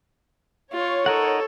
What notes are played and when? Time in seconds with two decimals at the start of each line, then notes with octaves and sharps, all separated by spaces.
0.73 F4 C#5
1.06 D#4 A4 A#4 F#5